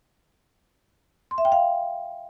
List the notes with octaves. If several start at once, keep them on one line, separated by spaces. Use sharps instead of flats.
C6
E5
G5
F5